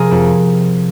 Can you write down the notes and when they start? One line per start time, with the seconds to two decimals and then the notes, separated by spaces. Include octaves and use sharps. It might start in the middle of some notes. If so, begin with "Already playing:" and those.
Already playing: C3 F3 G#4 A#4
0.11 F2